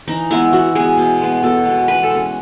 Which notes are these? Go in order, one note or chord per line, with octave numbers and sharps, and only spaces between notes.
E3 D#4
G#3 B3 E4
E3 F#4
G#3 B3 G#4
B2
G#3 B3
B2 A4
G#3 B3
E3 B4
A4
G#3 C#4